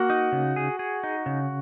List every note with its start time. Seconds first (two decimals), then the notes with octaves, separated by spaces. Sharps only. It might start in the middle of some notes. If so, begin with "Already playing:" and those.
Already playing: A#3 F#4 F#5
0.10 D#4
0.32 C#3
0.56 G#4
0.79 G#4
1.04 D#4
1.26 C#3